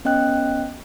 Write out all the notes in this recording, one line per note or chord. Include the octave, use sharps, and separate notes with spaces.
B3 C#4 D#5 G5 F#6